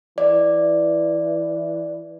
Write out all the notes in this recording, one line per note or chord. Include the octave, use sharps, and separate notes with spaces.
E3 D5